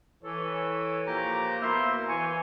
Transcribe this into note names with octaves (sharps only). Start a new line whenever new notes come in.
E3 A4 C#5
A#2 F3 A#3 G4 A#5
B2 A#3 E4 C5 C6
E3 C#5 G#5